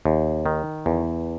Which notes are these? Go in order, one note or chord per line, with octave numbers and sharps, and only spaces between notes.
D#2
D#3
E2